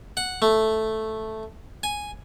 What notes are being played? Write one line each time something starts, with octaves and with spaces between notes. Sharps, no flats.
F#5
A3
G#5